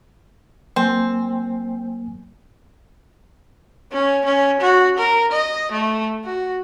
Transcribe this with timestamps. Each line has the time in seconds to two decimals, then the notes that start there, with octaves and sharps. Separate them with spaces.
0.76 F#3 A#3 C4 G#5
3.92 C#4
4.25 C#4
4.61 F#4
4.98 A#4
5.31 D#5
5.72 A3
6.24 F#4